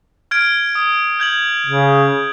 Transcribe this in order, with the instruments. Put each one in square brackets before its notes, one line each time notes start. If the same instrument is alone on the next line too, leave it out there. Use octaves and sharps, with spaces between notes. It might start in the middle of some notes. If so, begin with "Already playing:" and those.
[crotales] F6 G#6 D7
D#6
G6 G#6 F#7
[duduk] C#3